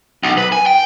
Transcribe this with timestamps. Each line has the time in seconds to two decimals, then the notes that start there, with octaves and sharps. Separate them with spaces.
0.23 B1
0.38 B4
0.52 G#5
0.66 G5